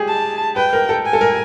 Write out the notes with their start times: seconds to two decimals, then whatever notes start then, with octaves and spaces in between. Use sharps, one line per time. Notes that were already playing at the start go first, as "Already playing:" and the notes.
Already playing: G4 G#4
0.08 A5
0.56 B4 G5
0.73 A#4
0.89 A4
1.05 G#5
1.13 A4
1.21 A#4